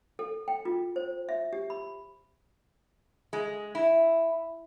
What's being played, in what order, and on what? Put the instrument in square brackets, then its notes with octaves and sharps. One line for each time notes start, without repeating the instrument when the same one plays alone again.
[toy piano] A4
G5
F4
C5
E5
G4
B5
[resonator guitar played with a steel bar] G#3
E4